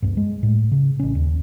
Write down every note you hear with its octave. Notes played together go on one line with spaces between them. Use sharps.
C#2 G2
G#3
A2
C#3
A1 C#4
D#2